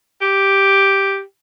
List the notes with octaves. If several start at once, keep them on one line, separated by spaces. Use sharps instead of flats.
G4